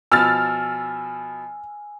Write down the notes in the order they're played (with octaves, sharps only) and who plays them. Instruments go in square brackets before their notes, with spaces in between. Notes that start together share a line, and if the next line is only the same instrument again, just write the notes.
[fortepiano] B2 F3 [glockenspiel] G#5 [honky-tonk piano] E6 F6 A6